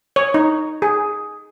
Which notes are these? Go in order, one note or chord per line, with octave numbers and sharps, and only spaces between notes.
C#5
D#4
G#4